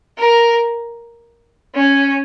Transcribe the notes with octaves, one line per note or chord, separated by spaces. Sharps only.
A#4
C#4